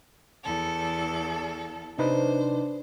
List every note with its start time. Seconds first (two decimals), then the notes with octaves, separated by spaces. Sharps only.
0.43 E2 A4
1.99 C3 D4 D#4 B4 C5